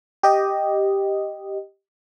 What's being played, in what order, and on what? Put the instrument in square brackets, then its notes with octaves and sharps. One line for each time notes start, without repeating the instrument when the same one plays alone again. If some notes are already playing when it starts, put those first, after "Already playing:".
[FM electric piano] G4 D#5